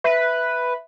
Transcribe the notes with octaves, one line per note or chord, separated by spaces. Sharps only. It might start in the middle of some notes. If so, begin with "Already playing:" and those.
B4 E5